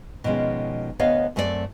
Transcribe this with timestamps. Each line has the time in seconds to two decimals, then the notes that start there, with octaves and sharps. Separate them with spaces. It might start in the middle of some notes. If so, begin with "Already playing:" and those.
0.24 B2 D#3 F3 G#3 C#4
0.99 D2 B3 C#5 D#5 F5
1.36 F#2 A3 C4 A4 D5